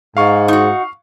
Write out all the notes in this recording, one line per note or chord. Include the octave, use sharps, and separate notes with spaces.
G#2 F5 C#6
D#4 F#4